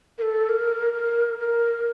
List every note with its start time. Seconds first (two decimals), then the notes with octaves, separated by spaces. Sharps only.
0.18 A#4
0.22 A4
0.49 A#4
0.94 A#4
1.39 A#4